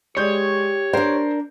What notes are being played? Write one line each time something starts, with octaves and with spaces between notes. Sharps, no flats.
G#3 G4 C#5 D5 G6
D4 A#4 C5